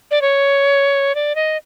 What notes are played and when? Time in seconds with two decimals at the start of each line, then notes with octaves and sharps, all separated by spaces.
0.11 D5
0.22 C#5
1.15 D5
1.35 D#5